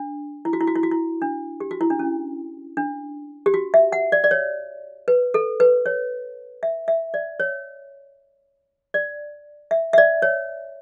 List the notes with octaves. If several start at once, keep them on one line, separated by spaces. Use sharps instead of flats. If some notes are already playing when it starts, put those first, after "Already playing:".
Already playing: D4
E4
F#4
E4
F#4
E4
F#4
E4
D4
G4
F#4
E4
D4
C#4
D4
G4
F#4
E5
F#5
D5
D5
C#5
B4
A4
B4
C#5
E5
E5
D5
C#5
D5
E5
E5
D5
C#5